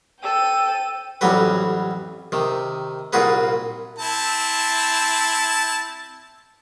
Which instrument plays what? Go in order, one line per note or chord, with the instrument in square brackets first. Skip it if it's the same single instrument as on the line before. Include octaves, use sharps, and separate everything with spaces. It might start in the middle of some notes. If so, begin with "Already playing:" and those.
[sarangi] A4 [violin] G5 D#7
[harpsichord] A1 F2 F#3 G3 F#4 B4
C3 D#3
C2 A#2 F4 F#4 G#4 B4
[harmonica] C4 E4 A5